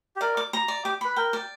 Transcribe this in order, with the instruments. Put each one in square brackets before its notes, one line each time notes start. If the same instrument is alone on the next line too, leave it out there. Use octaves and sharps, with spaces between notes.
[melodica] G4
[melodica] A#4 [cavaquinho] D5
[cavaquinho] D6
A#5
D5
[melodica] G4 [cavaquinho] D6
[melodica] B4 [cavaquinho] B5
[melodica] A#4 [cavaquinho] G5
[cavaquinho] D5